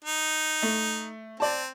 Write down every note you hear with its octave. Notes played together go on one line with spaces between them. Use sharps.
D#4
A3
C4 D5 A5